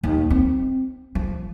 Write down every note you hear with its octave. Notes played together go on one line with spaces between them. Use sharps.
D#2
C4
F3